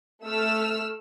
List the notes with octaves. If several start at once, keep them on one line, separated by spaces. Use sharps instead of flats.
A3 E6 F6